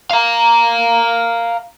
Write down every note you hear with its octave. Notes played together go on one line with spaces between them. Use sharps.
F5 A#5